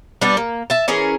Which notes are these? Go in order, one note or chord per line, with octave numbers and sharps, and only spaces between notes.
G3 B3 D4 D5
A#3
E5 A5
E3 C#4 G#4 A#4